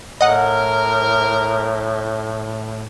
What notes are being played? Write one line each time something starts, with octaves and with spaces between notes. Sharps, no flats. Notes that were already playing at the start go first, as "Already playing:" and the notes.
A2 A#4 D#5 F#5